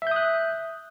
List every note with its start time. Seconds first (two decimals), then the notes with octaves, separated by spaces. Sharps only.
0.02 E5
0.07 G6
0.11 D#6
0.16 F#6